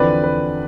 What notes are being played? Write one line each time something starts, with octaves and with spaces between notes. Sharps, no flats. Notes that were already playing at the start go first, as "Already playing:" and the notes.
Already playing: E2 D3 F3 C4 B4 D5
B4